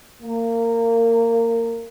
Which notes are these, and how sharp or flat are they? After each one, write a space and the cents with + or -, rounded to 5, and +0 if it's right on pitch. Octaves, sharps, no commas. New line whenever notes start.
A#3 -20